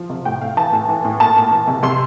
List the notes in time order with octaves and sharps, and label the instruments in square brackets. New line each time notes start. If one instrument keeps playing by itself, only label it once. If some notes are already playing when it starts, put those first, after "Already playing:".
Already playing: [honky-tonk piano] F3
C3
A2 G5
A2 F5
E3 A5
A2
E3
A2
A#2 A5
A#2
E3
C3
C3 C6